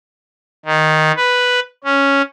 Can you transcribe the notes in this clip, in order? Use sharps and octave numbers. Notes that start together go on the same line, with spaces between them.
D#3
B4
C#4